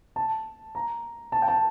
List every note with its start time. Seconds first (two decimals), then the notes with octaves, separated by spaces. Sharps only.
0.16 A5
0.75 A#5
1.32 A5
1.42 G5
1.48 A5